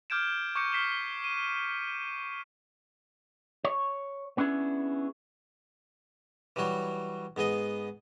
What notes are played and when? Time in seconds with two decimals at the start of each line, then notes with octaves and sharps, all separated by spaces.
0.10 D6 F6 G6 G#6 D7 E7
0.55 C#6 D6 G6 C#7 E7
0.72 C#6 F6 B6 C7 E7 G7
1.24 D#7
3.64 C#5
4.37 B3 C#4 D4 E4 G#4
6.56 E3 F#3 G3 F#4 C#5
7.36 G#2 B3 G#4 D#5